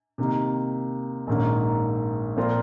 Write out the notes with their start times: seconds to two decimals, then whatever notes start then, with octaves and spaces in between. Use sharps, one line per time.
0.18 C3 D#3 A#3 D#4
1.27 A#1 G#2 D#3 A#3 C#4
2.36 A#2 F3 C4 F4 A#4